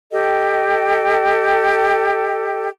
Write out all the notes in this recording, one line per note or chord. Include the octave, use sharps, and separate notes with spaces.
G4 A4 D#5 G5